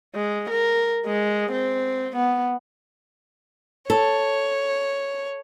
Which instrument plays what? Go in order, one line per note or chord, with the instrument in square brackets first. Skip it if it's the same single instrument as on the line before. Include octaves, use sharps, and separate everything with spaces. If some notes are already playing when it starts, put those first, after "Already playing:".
[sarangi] G#3
A#4
G#3
C4
B3
[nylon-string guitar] A4 [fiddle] C#5